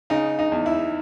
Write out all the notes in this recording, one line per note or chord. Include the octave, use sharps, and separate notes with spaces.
C#3 D#4
D#4
E2
E4